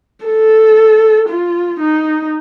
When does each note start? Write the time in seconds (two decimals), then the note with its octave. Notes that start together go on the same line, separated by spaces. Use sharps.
0.26 A4
1.29 F4
1.81 D#4